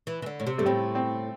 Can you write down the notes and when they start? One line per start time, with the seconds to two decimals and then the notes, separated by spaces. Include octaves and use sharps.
0.07 E3
0.22 E3
0.26 D3
0.40 A2
0.47 C3
0.58 G2 A3
0.66 A2 C4
0.95 C4